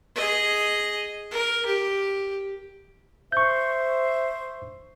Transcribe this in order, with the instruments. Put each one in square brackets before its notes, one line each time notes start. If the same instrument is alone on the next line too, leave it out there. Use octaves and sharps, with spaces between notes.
[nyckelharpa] G#4 D#5
A#4
G4
[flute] C5 [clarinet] E5 [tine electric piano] C#6 G6